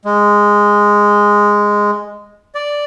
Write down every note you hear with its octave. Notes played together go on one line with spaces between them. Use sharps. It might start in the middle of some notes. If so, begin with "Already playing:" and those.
G#3
D5